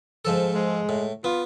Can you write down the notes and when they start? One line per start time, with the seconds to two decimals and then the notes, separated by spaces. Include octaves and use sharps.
0.25 G#2 F3 A4
0.54 G#3
0.89 A2
1.24 B3 F4